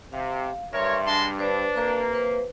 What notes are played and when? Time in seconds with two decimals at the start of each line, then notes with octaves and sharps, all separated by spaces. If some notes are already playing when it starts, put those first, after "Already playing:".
0.13 C3 F5
0.73 G2 A#4 C#5 E5 C6
1.06 G#3 D4 A5 C6
1.39 D4 B4 C5
1.76 C3 A#3 B4 A#5
2.13 B4 C5